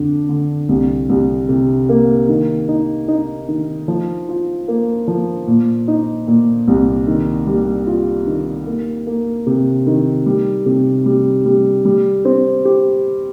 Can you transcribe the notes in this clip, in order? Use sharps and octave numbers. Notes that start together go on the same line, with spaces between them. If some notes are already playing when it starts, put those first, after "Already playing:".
Already playing: F2 D3 D4
D3
C2
C2
C3
A#3
D#3
D#4
D#4
D#3
F3
F4
A#3
F3
A#2
D#4
A#2
C2
D#3
G3
F4
D#3
A#3
A#3
C3
D#3
G3
C3
G3
G3
G3
C4
G4